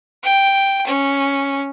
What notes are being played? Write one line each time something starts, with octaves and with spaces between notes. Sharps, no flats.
G5
C#4